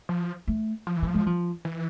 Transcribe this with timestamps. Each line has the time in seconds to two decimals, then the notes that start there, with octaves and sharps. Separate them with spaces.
0.09 F3
0.48 A3
0.87 F3
0.97 E3
1.02 F3 A3
1.14 G#3
1.26 F3
1.65 E3